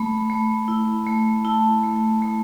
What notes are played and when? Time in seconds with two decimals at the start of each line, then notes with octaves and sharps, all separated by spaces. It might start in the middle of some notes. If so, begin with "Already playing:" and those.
Already playing: A3 B5
0.30 A3
0.68 E4
1.07 A3
1.45 E4 A5
1.83 A3
2.22 A3